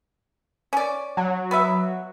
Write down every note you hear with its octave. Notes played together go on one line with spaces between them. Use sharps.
C#4 D5
F#3
B3 B4 E5